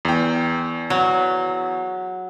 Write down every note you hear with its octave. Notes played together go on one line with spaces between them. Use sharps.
E2 G5
F#3